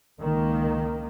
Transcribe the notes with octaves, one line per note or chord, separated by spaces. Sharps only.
C#2 D#3 A#3